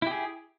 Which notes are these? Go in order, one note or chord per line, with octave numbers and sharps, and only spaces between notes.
E4 G4 G#4